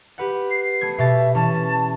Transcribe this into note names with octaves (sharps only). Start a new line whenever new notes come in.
G4 B4 F#5
C7
A3 B3 G#6
B2 G4 E5 A6
E3 C#4 A5